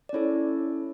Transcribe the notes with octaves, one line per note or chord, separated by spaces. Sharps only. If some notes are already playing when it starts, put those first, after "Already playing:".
D5
C#4 E4 A4 C#5